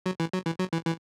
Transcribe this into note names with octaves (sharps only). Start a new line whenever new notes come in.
F#3
E3
F#3
E3
F#3
E3
E3